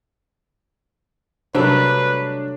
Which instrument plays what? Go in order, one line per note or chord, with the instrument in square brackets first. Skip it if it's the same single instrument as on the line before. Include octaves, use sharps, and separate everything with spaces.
[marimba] C3 C5 [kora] F#3 G3 A3 [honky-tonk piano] D4 [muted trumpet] B4